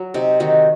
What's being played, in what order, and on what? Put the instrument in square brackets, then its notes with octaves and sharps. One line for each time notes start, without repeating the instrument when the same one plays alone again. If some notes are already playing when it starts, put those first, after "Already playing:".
Already playing: [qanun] F#3
C3 D#4
D#3 D#4 F#4